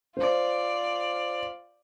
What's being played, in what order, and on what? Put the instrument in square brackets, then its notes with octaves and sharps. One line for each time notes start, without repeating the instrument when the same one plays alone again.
[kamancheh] F4 D5 [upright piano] C5